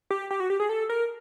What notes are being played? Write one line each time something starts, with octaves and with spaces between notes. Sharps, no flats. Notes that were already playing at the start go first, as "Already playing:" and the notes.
G4
G4
F#4
G4
G#4
A4
A#4